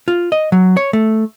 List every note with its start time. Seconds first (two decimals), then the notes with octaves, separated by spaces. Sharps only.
0.08 F4
0.32 D#5
0.52 F#3
0.77 C#5
0.93 A3